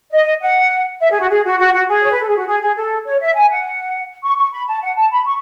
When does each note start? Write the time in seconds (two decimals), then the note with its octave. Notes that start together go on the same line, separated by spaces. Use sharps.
0.12 D#5
0.41 F#5
1.00 E5
1.10 G#4
1.19 F#4
1.29 G#4
1.44 F#4
1.58 F#4
1.73 F#4
1.88 G#4
2.01 C#5
2.10 B4
2.19 A4
2.28 G#4
2.37 F#4
2.46 G#4
2.61 G#4
2.76 A4
3.05 C#5
3.21 E5
3.35 G#5
3.50 F#5
4.23 C#6
4.37 C#6
4.52 B5
4.67 A5
4.81 F#5
4.96 A5
5.11 B5
5.26 C#6